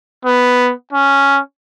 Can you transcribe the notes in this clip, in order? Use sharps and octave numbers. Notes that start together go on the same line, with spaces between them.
B3
C#4